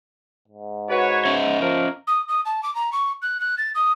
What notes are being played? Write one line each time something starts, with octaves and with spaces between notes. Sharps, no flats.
G#2
F#4 B4 C#5
C#4 D#5 E5
F3 A#4
D#6
D#6
A5
D6
A#5
C#6
F#6
F#6
A6
D#6